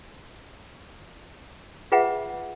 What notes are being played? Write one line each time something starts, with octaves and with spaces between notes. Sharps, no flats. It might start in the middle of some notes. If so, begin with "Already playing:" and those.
F4 G#4 B4 E5 F#5